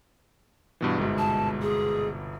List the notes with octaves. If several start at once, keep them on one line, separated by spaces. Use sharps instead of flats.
G2 B2 E3
G1 C2 G#2 B2 G#3
A5
G#4